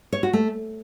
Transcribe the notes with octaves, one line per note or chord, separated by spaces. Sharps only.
C#5
F#4
A3